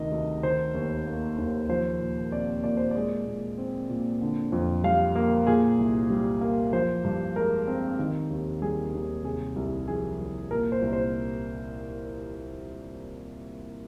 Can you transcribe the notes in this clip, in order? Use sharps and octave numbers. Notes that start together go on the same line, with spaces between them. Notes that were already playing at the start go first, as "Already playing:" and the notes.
Already playing: D2 C3 D#3 D#5
D2
D#3 C5
D#2
A#3
D#2
F3 C5
A#2
C4 D5
A#2 D5
C5
G#3 D5
A#2
C4
A#2
D3
F2
G3 F5
A#3
A#2 G#4
C2
G3
A#3
F3 C5
G2
G#3 A#4
C4
D#3
D#2
G3 G#4
D#2
C3 G#4
C2
F3 G#4
C2
A#2 A#4
C5
C2
C5